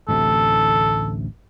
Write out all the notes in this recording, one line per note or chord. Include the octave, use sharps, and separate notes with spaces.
A1 D2 C3 A4